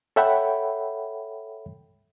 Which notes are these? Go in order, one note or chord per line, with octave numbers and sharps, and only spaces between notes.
A4 C#5 E5 F#5 G5 B5